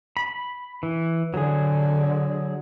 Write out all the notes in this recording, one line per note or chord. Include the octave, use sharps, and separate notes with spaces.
B5
E3
D3 F#3 G#4